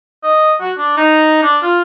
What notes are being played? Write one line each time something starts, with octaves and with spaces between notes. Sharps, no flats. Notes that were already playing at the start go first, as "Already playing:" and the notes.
D#5
F#4
D4
D#4
D4
F4